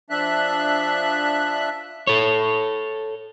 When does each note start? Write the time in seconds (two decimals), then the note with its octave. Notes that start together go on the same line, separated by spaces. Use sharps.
0.10 F3 D4 E5 F#6
2.07 A4 C#5